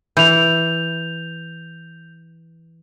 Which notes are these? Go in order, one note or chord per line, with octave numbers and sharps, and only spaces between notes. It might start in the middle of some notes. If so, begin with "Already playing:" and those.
E3 G6 F7